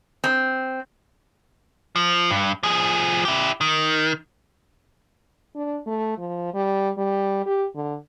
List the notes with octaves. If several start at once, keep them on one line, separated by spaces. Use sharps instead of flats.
C4
F3
G2
F3 G#4
E4 G4
D#3
D4
A3
F3
G3
G3
G4
D3